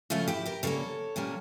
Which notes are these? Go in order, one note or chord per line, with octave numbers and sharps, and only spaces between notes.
C#3 F3 A3 C#4 F4 A4
E4 G4
G4 A#4
C#3 G3 A#3 A4 C#5
A#2 G3 A#3 C#4